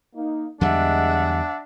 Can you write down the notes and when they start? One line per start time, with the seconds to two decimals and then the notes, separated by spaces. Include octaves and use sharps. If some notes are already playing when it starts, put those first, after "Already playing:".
0.16 A#3 D#4
0.61 E2 D3 G3 G#3 D4 E5 F#5